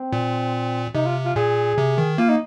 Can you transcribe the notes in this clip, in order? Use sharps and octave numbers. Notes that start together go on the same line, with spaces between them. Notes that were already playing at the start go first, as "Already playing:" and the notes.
Already playing: C4
A#2
C3 D#4
F4
F4
A#2 G#4
C3
D#3
A#3 F4
D#4